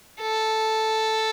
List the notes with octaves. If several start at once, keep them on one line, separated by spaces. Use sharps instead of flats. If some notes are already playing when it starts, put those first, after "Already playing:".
A4